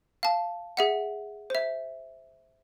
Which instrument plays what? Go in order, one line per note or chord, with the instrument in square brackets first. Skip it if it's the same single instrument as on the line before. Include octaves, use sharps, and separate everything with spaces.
[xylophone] F5 A5
G#4 E5 F#5
C5 E5